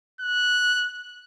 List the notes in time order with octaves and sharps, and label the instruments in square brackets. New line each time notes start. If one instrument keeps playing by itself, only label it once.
[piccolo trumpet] F#6